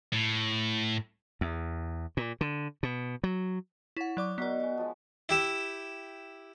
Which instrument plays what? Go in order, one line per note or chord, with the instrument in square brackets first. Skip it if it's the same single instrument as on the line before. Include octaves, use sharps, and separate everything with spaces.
[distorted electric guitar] A2
[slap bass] E2
A#2
D3
B2
F#3
[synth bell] E4 F#5 [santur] C#5
[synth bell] F#3 D5 D6 [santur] D#6
[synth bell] B3 D5 [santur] D#4 F#4 A#4
[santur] F#4 G#5
F3 G#3
[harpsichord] E4 G4 E5